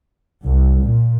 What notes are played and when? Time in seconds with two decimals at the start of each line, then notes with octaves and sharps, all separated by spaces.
0.45 C2
0.84 A#2